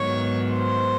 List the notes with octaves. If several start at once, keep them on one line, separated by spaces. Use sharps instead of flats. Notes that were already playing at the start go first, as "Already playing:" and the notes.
Already playing: G#2 D#3 F#3 B3 C#5
C5